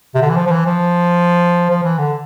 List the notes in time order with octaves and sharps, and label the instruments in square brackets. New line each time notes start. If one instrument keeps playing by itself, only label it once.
[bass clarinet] C3
D3
E3
F3
F3
E3
F3
F3
E3
D3